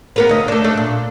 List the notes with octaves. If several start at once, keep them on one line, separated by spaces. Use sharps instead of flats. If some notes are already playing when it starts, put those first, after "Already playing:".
B3 A#4 B4
D2 D#5
A3 D4
A3 D4
A#2